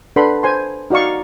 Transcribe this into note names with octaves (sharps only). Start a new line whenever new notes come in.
D4 A4 B4 F#5 B5 C6
C5 G#5 C6
D#4 F#4 D5 F5 C#6